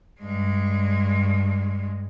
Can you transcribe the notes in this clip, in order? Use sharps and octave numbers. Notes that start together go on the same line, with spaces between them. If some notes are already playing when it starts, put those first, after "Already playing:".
G2 G#3